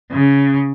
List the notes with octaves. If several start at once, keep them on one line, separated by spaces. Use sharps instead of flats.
C#3